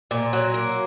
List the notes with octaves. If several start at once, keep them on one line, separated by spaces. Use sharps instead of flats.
A#2
F#3
A#3